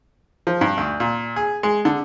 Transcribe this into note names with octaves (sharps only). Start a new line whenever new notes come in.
F3
G2
D2
A#2
G#4
G#3
D3